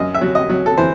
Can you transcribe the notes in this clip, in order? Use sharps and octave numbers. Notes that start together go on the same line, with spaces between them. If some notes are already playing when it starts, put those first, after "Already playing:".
Already playing: F#2 D#5
E5
F#3
D#5
F#3
A4
E3 C5